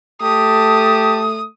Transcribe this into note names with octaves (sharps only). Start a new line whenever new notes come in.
A3 G4 A4 A5 D#6